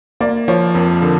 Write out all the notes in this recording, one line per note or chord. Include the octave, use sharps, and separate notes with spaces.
A#3 D5
F3 C#5
F2 A#4
D3 A#4